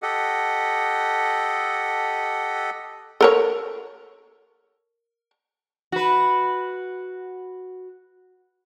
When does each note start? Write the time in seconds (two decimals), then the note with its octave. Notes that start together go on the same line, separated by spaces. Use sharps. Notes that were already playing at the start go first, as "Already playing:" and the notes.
0.02 G4 A4 D#5 F#5
3.21 A4 A#4 C#5
5.92 F#4 B4